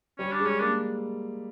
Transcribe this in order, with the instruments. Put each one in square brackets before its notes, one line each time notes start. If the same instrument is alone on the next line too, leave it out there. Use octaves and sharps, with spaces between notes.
[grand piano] G3 [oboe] C#4
[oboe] D4
[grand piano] G#3
[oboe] C#4
[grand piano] A#3 [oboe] D4